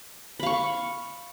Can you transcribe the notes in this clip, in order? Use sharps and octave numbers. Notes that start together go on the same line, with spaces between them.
F5 B5 C#6